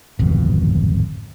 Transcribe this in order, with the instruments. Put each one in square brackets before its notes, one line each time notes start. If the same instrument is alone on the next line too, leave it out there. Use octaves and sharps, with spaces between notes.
[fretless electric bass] D1 G#1 F2 B2